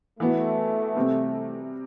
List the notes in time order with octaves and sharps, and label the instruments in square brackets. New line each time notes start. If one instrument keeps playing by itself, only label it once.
[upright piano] E3 B3 F#4 [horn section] A3
[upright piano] C3 G3 C4